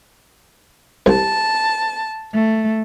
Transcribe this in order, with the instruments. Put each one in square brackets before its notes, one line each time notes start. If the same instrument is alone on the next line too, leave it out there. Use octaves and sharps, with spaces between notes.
[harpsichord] C2 [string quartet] A5
[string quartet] A3